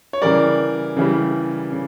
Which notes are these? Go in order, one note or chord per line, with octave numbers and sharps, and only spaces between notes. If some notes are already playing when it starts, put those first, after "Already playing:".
C#5
C#3 E3 G3 A#4 D5
C#3 E3 G3
C#3